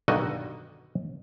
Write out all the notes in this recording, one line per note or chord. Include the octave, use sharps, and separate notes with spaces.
B1 G2 D3 D#3 F#4 D#5